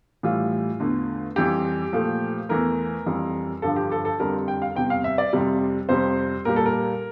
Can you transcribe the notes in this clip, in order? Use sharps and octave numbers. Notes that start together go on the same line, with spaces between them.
A2 E3 G3 F4
E2 D3 A3
F2 E3 G3 G4
A#2 F3 A3
E2 E3 A3 A#4
F2 E3 G3
G2 D3 F3 A4
G4
A4
A4
F2 D3 G3 A#4
G5
F5
E2 C3 G3 G5
F5
E5
D5
F2 C3 G3
F2 C3 G3 C5
A#2 G3 A#4
A4
A#4